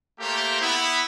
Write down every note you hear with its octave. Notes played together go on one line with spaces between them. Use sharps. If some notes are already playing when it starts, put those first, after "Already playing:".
A3 A#3 G4 C5 A#5
B3 E4